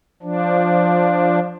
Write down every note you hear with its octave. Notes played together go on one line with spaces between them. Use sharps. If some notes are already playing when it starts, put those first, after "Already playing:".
F3 D4